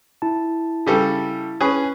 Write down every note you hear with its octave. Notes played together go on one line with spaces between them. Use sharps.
E4 A5
C#3 G3 A4
C#4 G#4 B4